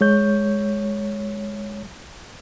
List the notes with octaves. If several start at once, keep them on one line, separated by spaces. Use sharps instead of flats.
G#3 C#5 G6